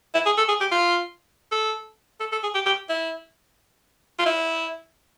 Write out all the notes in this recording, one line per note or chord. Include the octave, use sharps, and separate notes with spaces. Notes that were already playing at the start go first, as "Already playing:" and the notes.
E4
G#4
A4
G#4
G4
F4
A4
A4
A4
G#4
G4
G4
E4
F4
E4